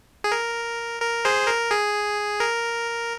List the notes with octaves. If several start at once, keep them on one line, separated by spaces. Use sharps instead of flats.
G#4
A#4
A#4
G#4 C5
A#4
G#4
A#4